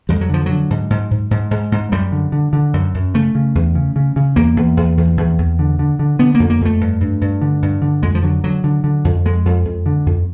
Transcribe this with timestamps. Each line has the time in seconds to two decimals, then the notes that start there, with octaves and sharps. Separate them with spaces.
0.09 F2 G3
0.21 F#3
0.30 D3 F3
0.46 D3 F#3
0.70 G#2
0.90 G#2
1.11 G#2
1.31 G#2
1.51 G#2
1.72 G#2
1.92 F#2 G3
2.12 D3
2.32 D3
2.53 D3
2.73 F#2
2.94 F#2
3.14 C#3 A3
3.35 C#3
3.55 E2
3.75 C#3
3.96 C#3
4.16 C#3
4.36 E2 A#3
4.56 E2
4.77 E2
4.97 E2
5.17 E2
5.38 E2
5.59 D3
5.79 D3
5.99 D3
6.19 D3 B3
6.35 F2 A#3
6.50 A#3
6.61 F2 A3
6.81 G2
7.01 G2
7.21 G2
7.42 D3
7.62 G2
7.82 D3
8.03 F2 G#3
8.15 F3
8.23 D3 F#3
8.44 D3 F#3
8.64 D3
8.84 D3
9.05 F2
9.25 F2 G#3
9.45 F2
9.65 F2
9.86 D3
10.06 F2